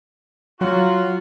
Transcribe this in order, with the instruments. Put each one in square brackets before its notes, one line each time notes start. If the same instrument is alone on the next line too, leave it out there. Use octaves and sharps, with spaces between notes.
[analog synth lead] F#3 [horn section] F4 F#4